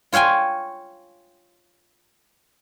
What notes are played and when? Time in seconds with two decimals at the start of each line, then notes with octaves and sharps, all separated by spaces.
0.12 F4 C#5 F5 G5 G#5